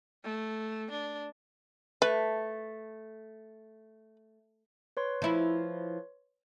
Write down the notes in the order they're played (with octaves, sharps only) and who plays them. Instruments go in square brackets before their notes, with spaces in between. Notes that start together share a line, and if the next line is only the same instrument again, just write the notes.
[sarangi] A3
D4
[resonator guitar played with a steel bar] A3 [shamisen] B4
[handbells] B4 C#5 C6
[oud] F3 E4